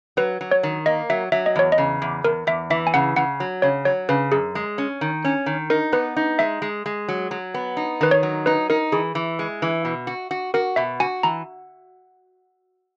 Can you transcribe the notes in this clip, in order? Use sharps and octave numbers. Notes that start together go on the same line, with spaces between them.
F#3 B4
F#3
C#5
D#3
A#3 D#5
F#3 E5
F#3 E5
D#5
E2 C#5
D#5
C#3
E2
E2 A#4
E2 E5
E3 E5
G#5
C#3 F#5
C#3 F#5
F#3
C#3 C#5
F#3 C#5
C#3 B4
F#2 G#4
G#3
C#4
D#3
C#4
D#3
D#4 A#4
B3 B4
D#4
G#3 E5
G#3
G#3
F#3
F#3
B3
D#4
D#3 B4
C#5
F#3
D#4 B4
D#4 A#4
E3 G#4
E3
G#3
E3
B2
F#4
F#4
F#4 A#4
B2 E5
F#4 G#5
E3 A#5